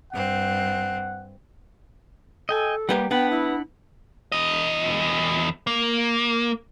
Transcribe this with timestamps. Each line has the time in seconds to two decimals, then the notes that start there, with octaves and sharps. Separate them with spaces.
0.13 G2 C4 F#5
2.49 A4 D#5 G5 G#5
2.89 G3 A#3 G4 B4 F#5
3.11 B3 D4 F#5 G5 B5
3.30 E4
4.32 E2 D#5
5.67 A#3